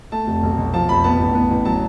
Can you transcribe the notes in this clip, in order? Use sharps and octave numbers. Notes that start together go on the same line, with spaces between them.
A3 A5
F1
B1
B1
F3 A5
F1 B5
B3 A5
A1
B3
A1
F#3 A5